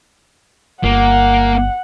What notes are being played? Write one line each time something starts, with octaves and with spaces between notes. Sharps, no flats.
G1 A#3 F#5